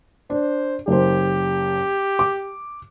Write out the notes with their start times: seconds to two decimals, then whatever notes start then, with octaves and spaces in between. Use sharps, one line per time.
0.30 D4 C5
0.88 F#1 G4 C5
2.19 D6